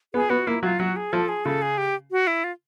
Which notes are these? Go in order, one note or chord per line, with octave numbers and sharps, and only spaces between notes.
B3 G#4
B3 F#4
A#3 E4
F#3 F4
F#3 F#4
G#4
F3 A4
G#4
C#3 A4
G#4
G4
F#4
E4
F4